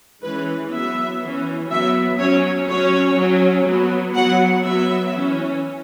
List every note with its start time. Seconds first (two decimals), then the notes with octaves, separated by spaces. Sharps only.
0.23 E3 G#3 C#4 B4
0.71 F#3 B3 E5
1.21 E3 C#4
1.70 F#3 B3 E5
2.19 F#3 C#4 C#5
2.68 F#3 C#4 C#5
3.17 F#3 C#4
3.66 F#3 B3
4.15 F#3 B3 F#5
4.64 F#3 B3 E5
5.13 E3 C#4